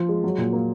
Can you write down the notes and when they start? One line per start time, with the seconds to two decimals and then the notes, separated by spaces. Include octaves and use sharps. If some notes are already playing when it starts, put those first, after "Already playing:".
Already playing: F3
0.09 G#3
0.24 F#3
0.38 A#2
0.53 A#3